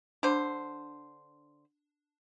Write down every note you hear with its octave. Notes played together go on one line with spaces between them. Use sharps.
D3 D4 C5